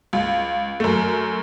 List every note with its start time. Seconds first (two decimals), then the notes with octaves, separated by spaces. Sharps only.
0.13 C#2
0.80 F#2 A3